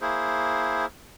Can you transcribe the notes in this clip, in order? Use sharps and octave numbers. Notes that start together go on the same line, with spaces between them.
A#3 E4 G#4 C5